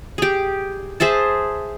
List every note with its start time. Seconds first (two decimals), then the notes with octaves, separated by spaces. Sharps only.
0.18 G4 G#4
1.00 G#4 C5 E5 A5